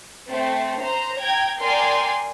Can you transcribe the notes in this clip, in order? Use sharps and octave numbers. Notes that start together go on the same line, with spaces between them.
A3 C4
C5 A#5
G5 A#5 G#6
A#4 D5 G5 G#5 C6